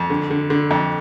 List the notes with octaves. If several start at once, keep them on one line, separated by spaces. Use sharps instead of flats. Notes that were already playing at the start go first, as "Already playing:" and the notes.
Already playing: F2
D3
D3
D3
F2